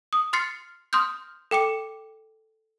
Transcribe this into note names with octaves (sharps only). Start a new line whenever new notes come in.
D#6
C6 F6 A6 C7 C#7
C6 D#6 F6 G6
A4 G5 D6 C#7